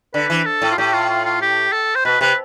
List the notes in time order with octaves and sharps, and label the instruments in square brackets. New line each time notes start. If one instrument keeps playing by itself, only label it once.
[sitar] D3 [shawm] B4
[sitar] E3
[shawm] A4
[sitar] A2
[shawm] F4
[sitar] A2 [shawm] G4
[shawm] F4
F4
F4
G4
A4
C5
[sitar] B2 [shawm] B4
[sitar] C3 [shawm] B4